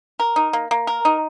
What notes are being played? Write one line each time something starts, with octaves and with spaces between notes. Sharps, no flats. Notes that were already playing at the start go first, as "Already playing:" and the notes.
A#4
D#4
A#3
A#3
A#4
D#4